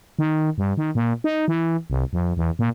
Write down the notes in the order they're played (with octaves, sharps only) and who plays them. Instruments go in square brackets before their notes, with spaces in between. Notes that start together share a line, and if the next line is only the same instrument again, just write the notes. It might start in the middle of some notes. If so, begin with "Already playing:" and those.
[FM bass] D#3
G2
D#3
A#2
D#4
E3
C2
F2
E2
A#2